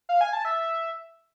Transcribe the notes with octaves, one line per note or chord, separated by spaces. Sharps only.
F5
G#5
A5
E5